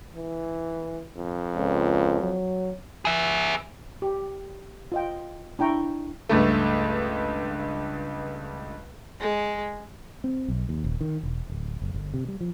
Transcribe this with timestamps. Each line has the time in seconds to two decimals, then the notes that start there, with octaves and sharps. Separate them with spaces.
0.15 E3
1.16 F2
1.56 C#2
2.20 F#3
3.05 G#4 E5
4.02 G4
4.92 F4 D#5 G5
5.59 D4 E4 G5 A#5 C#6
6.29 C#2 G2 A3
9.20 G#3
10.24 C4
10.48 B1
10.69 D#2
10.84 D#1
11.01 D#3
11.23 E1
11.49 D1
11.82 F#1
11.94 G1
12.14 C3
12.28 G3
12.41 F3